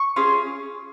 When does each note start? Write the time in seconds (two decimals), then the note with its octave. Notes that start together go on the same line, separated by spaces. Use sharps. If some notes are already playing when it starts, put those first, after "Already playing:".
Already playing: C#6
0.16 C#4 F4 G#4